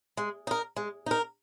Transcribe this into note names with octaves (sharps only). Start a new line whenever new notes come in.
G#3
D#4 A#4
G#3
D#4 A#4